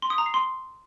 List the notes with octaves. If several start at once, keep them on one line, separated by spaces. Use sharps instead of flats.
C6
D#6
A#5
C7
C6